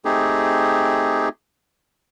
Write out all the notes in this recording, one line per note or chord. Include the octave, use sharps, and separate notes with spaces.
A3 C4 D#4 G4 G#4